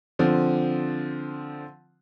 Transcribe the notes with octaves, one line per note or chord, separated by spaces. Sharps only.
D3 F3 C4